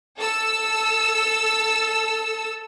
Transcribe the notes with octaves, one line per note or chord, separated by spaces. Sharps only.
A4 E6